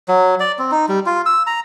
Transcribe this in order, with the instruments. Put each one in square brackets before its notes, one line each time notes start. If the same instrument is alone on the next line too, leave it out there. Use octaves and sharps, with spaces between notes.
[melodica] F#3
D5
C4
D#4
G3
F4
E6
A#5